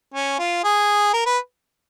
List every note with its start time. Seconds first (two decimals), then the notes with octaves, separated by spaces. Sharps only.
0.14 C#4
0.39 F4
0.64 G#4
1.13 A#4
1.26 B4